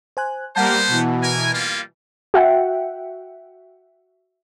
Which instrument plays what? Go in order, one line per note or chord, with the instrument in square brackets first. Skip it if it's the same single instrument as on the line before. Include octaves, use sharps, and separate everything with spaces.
[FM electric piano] C5 G#5 F#6
[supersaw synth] G3 A#3 A#4 [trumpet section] B3 C5 [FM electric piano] F#5 A5
[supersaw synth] B2 E3
[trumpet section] A#4 G#5
G3 A#3 F4
[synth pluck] F#4 E5 F#5 G5